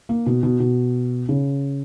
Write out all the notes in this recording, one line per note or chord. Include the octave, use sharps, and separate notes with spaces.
A#3
B2
B2
B2
C#3